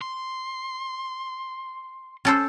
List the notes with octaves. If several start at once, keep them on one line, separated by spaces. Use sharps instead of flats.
C6
C#4 A4 C5